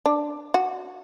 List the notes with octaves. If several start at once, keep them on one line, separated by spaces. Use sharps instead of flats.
D4
F#4